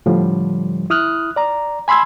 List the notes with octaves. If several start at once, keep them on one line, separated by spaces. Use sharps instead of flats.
A2 D3 F3 G3
E4 D#6 F6 F#6
D5 A#5
G#5 B5 C6 E6 G#6